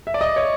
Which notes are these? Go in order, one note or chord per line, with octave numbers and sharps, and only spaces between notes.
E5
D5
D#5
C#5